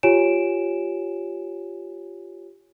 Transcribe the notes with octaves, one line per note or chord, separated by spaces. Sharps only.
F4 G4 C#5 G#5 D7 E7